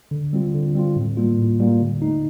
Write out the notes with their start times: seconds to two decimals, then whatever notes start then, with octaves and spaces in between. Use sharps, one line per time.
0.11 D3
0.33 G3 C4 F4
0.54 D3
0.75 G3 C4 F4
0.96 A2
1.17 G3 A#3 F4
1.39 A2
1.60 G3 A#3 F4
1.81 D3
2.02 A3 D#4